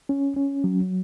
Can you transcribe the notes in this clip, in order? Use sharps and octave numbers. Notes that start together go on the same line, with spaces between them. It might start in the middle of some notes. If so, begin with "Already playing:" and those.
C#4
C#4
F#3